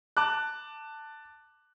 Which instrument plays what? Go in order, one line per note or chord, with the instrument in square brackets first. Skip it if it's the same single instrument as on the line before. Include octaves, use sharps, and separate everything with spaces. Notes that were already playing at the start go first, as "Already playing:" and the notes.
[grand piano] A5 D6 F#6